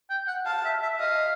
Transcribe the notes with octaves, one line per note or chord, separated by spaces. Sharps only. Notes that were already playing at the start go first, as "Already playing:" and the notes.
G5
F#5
F5 A5
E5
E5
D#5 F5